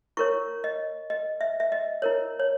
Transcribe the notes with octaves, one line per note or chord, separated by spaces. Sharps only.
E4 A#4 C#5 C#6
D#5
D#5
E5
E5
D#5
E4 A#4 C#5
C#5